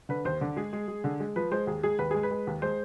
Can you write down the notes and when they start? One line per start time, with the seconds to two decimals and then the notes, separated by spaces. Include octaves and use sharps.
0.09 D3 B4
0.25 D#2 C5
0.41 D3
0.56 G#3 G#4
0.73 G#3
0.88 G#3
1.04 D3
1.20 G#3
1.36 F3 B4
1.51 G#3 C5
1.67 D#2 G#4
1.83 G#3 G#4
1.99 D#2 B4
2.11 G#3 G#4
2.23 B4
2.31 G#3
2.47 D#2
2.62 G#3 C5